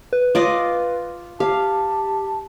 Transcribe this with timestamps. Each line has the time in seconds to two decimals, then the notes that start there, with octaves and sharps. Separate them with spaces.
0.13 B4
0.35 F4 D5 D#5
1.40 G4 F5 A5